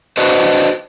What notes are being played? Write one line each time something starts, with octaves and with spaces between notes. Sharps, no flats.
D4 F#4 B4 C5 D#5